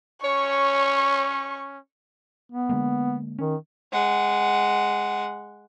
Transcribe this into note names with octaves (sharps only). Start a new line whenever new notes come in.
C#4 C#5 C#6
B3
D3 G#3 A#3
D#3 C#4
G#3 F#5